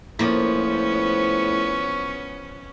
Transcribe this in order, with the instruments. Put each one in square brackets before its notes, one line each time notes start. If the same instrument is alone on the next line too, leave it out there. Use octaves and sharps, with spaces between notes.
[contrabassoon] A2 [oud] F3 A#3 [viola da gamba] B3 C#4